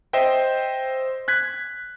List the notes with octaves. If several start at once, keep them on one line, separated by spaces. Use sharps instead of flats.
C5 D#5 E5 G5
F#6 G#6 B6